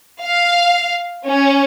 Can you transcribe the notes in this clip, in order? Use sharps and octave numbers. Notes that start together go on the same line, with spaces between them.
F5
C#4